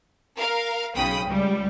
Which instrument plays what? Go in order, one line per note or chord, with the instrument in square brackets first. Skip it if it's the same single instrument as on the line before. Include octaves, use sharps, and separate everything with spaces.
[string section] A#4 F5
B1 C#3 G5 B5 D#6
C#2 G3